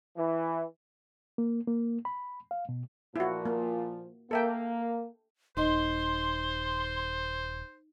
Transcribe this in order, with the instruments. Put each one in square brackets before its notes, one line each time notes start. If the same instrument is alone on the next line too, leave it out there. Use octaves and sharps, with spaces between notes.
[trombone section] E3
[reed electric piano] A#3
A#3
B5
F5
B2
[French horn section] A#2 F3 [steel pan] E4 F#4
[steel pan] A#3
[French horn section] A#3 [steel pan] A4 E5 G5
[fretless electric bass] D#1 [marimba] D#4 D#5 [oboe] C5 [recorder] C6